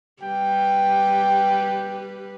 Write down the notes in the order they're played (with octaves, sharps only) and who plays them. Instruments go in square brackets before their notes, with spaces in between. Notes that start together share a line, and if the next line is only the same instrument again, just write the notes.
[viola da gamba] G3 G4 B4 [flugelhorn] G5